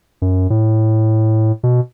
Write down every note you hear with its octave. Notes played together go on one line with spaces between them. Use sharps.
F#2
A2
B2